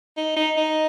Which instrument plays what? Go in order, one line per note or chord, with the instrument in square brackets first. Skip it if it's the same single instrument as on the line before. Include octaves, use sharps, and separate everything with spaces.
[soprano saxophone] D#4
D#4
D#4